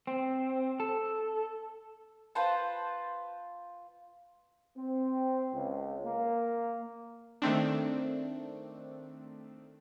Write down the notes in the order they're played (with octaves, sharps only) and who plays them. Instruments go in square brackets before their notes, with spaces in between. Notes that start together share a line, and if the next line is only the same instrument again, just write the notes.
[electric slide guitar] C4
A4
[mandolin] F4 B4 C5 A5
[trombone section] C4
C#2
A#3
[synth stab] D#3 A3 C4 D4